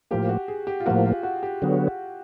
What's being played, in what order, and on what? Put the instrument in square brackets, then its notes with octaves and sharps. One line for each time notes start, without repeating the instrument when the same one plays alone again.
[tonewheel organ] A2 F3 A#3 [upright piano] G4
[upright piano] F#4
G#4
G4
F4
[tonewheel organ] A2 F3 A#3 [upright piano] F#4
[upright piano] F4
F#4
G4
[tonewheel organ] D3 F#3 B3